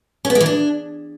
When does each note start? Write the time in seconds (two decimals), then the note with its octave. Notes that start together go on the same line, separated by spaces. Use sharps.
0.25 C#4
0.30 B3
0.35 G#3
0.40 E3
0.46 D4